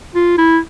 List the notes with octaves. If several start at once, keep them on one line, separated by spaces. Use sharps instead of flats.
F4
E4